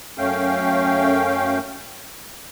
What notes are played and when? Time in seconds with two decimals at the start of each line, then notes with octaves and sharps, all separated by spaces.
0.18 F#2 A3 C#4 F5 G5